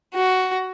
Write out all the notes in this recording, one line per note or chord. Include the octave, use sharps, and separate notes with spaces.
F#4